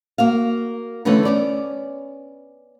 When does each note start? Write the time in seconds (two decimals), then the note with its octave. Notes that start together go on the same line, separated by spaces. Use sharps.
0.18 A#3 F#4 F5
1.05 D3 E3 A3 B3 C#4 B4
1.25 B3 C#4 D5